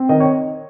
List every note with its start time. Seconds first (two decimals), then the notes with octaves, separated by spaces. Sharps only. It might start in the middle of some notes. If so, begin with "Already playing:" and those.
Already playing: C4
0.09 D#3 D#5
0.20 C#5